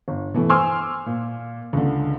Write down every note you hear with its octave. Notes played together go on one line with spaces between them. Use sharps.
G1
B2 E3 A3
C5 G#5 C6 D6 E6 F6
A#2
C#2 D3